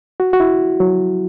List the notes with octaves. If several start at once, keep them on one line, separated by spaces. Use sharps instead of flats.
F#4
F#4
E4
F#3